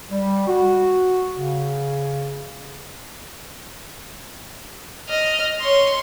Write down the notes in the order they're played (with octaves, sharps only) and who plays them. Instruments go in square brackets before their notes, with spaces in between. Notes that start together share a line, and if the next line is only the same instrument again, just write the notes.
[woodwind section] G3
F#4
C#3
[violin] D#5 F6
C#5 C6